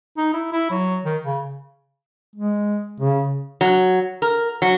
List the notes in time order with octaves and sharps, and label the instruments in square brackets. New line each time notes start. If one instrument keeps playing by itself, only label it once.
[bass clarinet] D#4
E4
E4
F#3
D#3
C#3
[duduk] G#3
C#3
[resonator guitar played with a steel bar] F#3
A#4
F#3